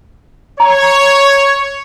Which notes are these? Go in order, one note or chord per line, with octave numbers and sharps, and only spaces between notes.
C#5 A#5